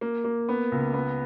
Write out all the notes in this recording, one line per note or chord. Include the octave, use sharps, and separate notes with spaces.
A#3
A#3
B3
C#2
B3